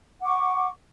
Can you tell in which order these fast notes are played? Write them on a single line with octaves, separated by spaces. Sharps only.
F#5 D6 C#6